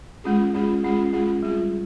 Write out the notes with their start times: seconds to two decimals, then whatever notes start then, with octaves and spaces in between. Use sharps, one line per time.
0.24 G#3 C#4 F4 G#4
0.54 G#3 C#4 F4 G#4
0.83 G#3 C#4 F4 G#4
1.13 G#3 C#4 F4 G#4
1.43 G3 C4 F4 G#4